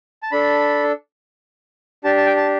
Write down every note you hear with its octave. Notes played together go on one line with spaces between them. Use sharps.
A5
D4 A4 B5
D4 G4 A5
A5
G5
A5